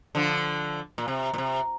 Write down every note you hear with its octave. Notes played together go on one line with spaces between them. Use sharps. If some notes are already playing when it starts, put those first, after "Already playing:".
D3 F3
A#2
C3
A#2
C3